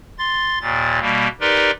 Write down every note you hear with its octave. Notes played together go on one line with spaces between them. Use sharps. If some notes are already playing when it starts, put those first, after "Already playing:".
C6 A6
D#2 A#2 A6
B2 G3 A#3
D#4 G4 A#4 B4 D5 C6